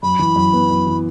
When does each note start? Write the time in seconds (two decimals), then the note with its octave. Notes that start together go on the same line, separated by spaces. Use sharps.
0.03 F#2 B5
0.19 E3
0.36 F#2
0.53 B3
0.71 F#2
0.87 E3